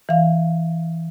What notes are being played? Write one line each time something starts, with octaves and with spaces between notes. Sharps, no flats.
E3 F5